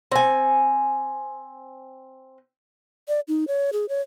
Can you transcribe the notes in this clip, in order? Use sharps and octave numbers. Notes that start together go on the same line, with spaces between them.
C4 G#5
D5
D#4
C#5
G#4
C#5